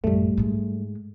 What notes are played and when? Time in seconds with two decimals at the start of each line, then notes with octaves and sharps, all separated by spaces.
0.04 A1 F#2 G3 A3
0.38 G#2 G#3